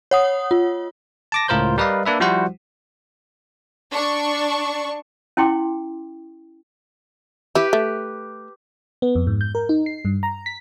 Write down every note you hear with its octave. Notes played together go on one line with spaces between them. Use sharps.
C#5 F#5 D#6
F4
A5 D6 A#6
C#2 A2 F4 A#4 C5 G6
G3 A#4 B4 D5 D#5 F5
A#3 D4 B4 E5
F3 G3 E4 F#4 C5 F#5
D4 C#6
C#4 E4 G5 C6 D6
E4 G4 B4
A3
B3
F2
G#2
G6
A#4
D#4
C7
G2
A#5
B6